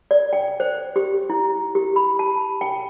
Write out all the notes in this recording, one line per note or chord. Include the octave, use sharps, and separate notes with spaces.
D5
G5
C5
G4
E4
G4
B5
A5
G5